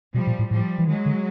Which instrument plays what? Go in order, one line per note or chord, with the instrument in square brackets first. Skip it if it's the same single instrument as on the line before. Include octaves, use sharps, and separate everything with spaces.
[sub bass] B2 [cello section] F3 G3
[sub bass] A#2
A2
[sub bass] A2 [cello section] F3 G3
[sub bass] E3
[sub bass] D#3 [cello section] F#3 G#3
[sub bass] D3